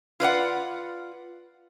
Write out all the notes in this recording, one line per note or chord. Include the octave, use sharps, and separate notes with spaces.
F4 B4 D5 F#5